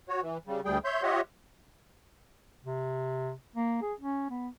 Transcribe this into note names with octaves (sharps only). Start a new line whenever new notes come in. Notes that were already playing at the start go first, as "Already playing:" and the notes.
F#4 C#5
E3
C#3 G3
D2 G3 G#4 G5
C#5 E5 C6 G6
F4 G4 C#5 D#5 E5 F#5
C3
A#3
G#4
C#4
B3